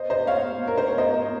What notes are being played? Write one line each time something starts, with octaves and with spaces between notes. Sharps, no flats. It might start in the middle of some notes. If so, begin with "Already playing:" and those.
Already playing: C5 D#5
C5 D#5
C#5 F5
A#4
C5
C#5
C5 D#5